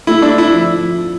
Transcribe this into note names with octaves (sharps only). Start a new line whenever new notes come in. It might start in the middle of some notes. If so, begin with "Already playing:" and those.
A3 E4
A3 D4
C4 E4
F3